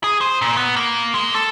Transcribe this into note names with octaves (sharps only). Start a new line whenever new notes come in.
G#4
C5
A#2
B3
A#3
G#3
A4